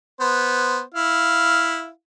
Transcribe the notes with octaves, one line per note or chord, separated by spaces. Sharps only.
B3 C5
E4 F5